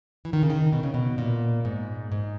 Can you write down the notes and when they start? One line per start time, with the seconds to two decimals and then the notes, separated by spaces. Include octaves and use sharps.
0.25 E3
0.33 D#3
0.43 C#3
0.50 D#3
0.72 B2
0.83 C#3
0.94 B2
1.18 A#2
1.65 G#2
2.12 G#2